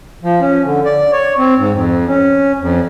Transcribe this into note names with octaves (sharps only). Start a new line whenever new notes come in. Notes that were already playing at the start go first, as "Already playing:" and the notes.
F3
C#4
D3
D5
C#5
C4
G#2
F2
C#4
F2